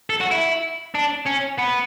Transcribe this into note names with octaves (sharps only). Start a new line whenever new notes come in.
A4
F#4
E4
D4
C#4
B3